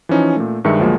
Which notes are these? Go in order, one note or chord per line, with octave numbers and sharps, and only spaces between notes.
E3 F3 C#4 D#4
A#2 A3
G2 D#3 G#3 E5 C#7
D2 F3 F#3 G#3 A#3